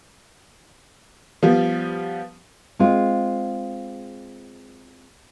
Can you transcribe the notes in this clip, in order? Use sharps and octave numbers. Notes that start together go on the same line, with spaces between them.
F3 G3 B3
G#3 C4 F4